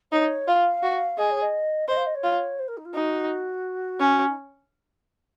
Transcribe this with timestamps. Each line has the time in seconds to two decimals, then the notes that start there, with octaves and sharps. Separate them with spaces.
0.12 D#4 C#5
0.48 F4 F5
0.83 F#4
1.18 G#4 D#5
1.30 C#5
1.41 D#5
1.88 C5 D#5
1.97 F5
2.06 D#5
2.15 C#5
2.24 F4
2.59 C5
2.68 A#4
2.77 D#4
2.85 F4
2.94 D#4 F#4
4.00 C#4
4.28 D#4